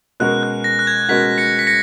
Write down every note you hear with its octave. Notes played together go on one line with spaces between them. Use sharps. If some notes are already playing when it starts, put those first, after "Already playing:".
B2 G#3 C#4 F#4 A#4 F#6
F#6
A#6
F#6
G#6
B2 G#3 C#4 F#4 A#4 B6
A#6 C#7
B6
A#6 C#7